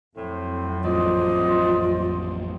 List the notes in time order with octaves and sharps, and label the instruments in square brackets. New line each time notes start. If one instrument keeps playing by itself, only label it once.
[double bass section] F2 F#3 [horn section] A2 C4
[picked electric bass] A1 A2 F3 [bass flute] F4 [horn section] C5 D5 D#5